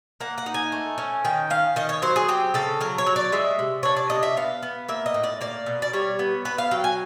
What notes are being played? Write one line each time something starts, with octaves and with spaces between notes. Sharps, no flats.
A#3 F#5
F#5
D#4
G#5
A3
C#4
D#3 G5
C#4 F5
D#3 D#5
C#5
F#3 C5
G#4
C4 G4
C#3 A4
F#3 A#4
C#5
F#3
D5
G#3 E5
C3
D4 C#5
D5
C3 D#5
E5
B3 F5
B3
A#3 E5
D#5
A2
D5
A#3 D5
B2
D5
G3 C#5
B3
B3 B4
F5
F#3 G5
G#5